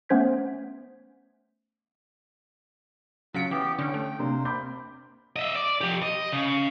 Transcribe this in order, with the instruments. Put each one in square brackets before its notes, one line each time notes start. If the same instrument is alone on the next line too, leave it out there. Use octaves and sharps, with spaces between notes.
[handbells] A3 B3 C#4 C5 G#6 B6
[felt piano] C#3 C#7 [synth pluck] F#3 B6 D7 [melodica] F4
[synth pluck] E3 [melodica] B3 G4
[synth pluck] D3 C#4 [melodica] G5
[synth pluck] A3
[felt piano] C3 A#3 D4 [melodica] C5
[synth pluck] C3 [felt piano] B5 D6 G6
[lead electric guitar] D#5 E5
D5
F3 G4
D#5
C#3